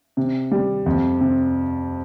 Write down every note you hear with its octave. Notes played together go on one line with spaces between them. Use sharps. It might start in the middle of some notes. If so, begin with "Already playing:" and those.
C3
G3
F2
C3